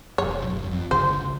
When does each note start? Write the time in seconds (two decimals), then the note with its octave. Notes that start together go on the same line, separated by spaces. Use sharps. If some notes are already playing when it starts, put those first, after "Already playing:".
0.18 E1 F#2 C#5
0.47 G1 F#2
0.71 F2
0.91 G1 C#2 D3 C5